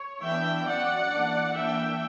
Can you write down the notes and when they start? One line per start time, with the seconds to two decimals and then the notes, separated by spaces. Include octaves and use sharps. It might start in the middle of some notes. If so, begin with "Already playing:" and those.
Already playing: C#5
0.23 E3 B3 D4 E5 G5
0.66 F#3 C#4 D5 F#5
1.10 E3 A#3 D4
1.54 E3 A#3 D4 E5 G5